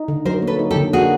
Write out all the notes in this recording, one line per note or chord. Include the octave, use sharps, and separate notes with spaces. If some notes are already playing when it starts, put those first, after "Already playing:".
Already playing: D#4
D3
F#3 A#4 C5
A#3
A4 B4
D#4
G4 A4
D3
A#3 F#4 G#4